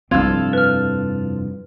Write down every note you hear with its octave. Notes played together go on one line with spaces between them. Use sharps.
F1 G2 F3 C4 E4 F4 A4 G#6
B4 F6